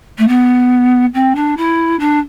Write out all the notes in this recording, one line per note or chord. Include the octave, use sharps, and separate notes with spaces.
A3
B3
C4
D4
E4
D4